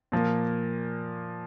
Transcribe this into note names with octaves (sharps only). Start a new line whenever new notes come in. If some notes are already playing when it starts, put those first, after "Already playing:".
A#2 F3 A#3